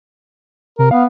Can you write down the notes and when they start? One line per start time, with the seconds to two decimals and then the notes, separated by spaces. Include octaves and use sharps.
0.79 C3 A#4
0.91 B3 F5